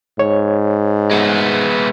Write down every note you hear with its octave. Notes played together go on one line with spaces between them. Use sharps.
G#2 C#5
G#3 B3